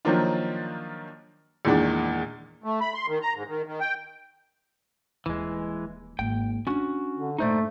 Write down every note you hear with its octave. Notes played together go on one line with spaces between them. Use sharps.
D#3 F3 F#3 A#3 D4 F4
E2 A#2 D#3 E3 G#3 D4
A3
B5
C6
D#3
A#5
G#2
D#3
D#3
G5
D#1 E3 G#3
G#1 A#3 G5
C#4 D4 E4 F#4
D3
G2 A#2 A3 D#4 C5 D5